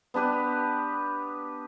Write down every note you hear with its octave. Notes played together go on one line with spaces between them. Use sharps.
B3 D4 G4 B4